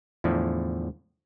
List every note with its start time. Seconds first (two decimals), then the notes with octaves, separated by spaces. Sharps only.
0.24 E2 A2 D3 F3